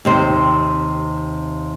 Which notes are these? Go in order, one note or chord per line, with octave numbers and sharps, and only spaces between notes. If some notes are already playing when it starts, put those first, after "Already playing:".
D#2 C3 C5